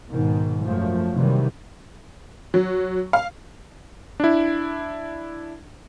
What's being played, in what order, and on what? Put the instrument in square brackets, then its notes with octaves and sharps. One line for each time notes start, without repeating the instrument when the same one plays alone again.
[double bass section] G#2 B2 D#3
F#2 F3 A3
C3 D#3 E3 F#3 G3
[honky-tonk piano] F#3
F5
[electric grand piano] D4 E4